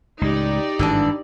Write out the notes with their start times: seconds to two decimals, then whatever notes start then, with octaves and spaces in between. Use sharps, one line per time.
0.21 C#2 A2 D#4 G4 D5
0.79 G#1 G2 D3 E3 D4